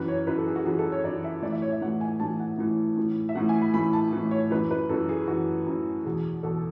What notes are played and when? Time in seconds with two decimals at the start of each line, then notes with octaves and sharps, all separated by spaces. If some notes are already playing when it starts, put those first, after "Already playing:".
Already playing: F#2 E3 B4
0.08 C#5
0.27 F#2 E3 B4
0.38 A4
0.47 G#4
0.56 F#4
0.65 F#2 E3 G#4
0.79 A4
0.92 C#5
1.04 F#2 E3 D5
1.24 E5
1.42 A2 E3 D5
1.52 E5
1.62 C#5
1.72 E5
1.82 A2 E3 F#5
2.01 G#5
2.20 A2 E3 A5
2.40 F#5
2.58 A2 E3
2.98 A2 E3
3.29 E5
3.35 A2 E3 F#5
3.49 G#5
3.61 B5
3.74 A2 E3 B5
3.93 A5
4.13 A2 E3
4.31 C#5
4.51 F#2 E3 B4
4.71 B4
4.89 F#2 E3 A4
5.09 G#4
5.28 F#2 E3 F#4
5.66 F#2 E3
6.05 E2 B2 G#4
6.43 E2 B2 A4